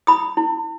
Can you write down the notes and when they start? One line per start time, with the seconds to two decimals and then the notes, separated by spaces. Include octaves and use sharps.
0.07 E4 B5 D#6
0.37 E4